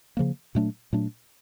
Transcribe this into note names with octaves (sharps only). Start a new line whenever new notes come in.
C#3 F3 A#3
A#2 F#3 A3 D4
A#2 F#3 A3 D4